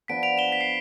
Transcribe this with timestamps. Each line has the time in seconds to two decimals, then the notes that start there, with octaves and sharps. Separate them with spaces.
0.08 F3 B3 D4 B6 D7
0.23 D7 F7
0.38 E7 G7
0.52 B6
0.61 C7